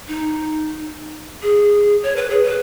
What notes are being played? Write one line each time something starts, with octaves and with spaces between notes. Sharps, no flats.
D#4
G#4
C#5
B4
G#4
B4